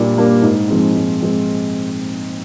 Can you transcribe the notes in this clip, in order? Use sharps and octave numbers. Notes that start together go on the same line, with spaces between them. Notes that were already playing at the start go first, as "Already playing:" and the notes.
Already playing: A#2 G3 A#3 D4
G3 A#3 D4
G#2
F3 G#3 C4
G#2
F3 G#3 C4